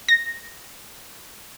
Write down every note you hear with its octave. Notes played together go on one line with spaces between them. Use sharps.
A#6